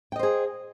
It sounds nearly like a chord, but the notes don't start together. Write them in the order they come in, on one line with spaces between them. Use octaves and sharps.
G5 D#5 C5 G#4